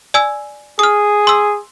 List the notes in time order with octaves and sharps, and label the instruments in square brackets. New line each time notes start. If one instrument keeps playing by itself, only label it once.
[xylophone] D5 G#5 E6
[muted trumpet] G#4 [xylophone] D#6 F6
[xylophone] C6 E6